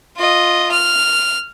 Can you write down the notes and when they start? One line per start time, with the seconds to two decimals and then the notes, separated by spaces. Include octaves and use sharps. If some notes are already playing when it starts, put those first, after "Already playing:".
0.17 F4 D#5
0.71 F6